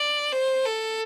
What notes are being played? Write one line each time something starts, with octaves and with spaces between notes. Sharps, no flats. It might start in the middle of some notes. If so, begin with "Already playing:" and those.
Already playing: D5
C5
A4